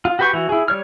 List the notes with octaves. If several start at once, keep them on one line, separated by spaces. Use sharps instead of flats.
F4
F#4 G4 B4 G5 C#6
E3 F#4
E4 G#4
G3 C#5 F6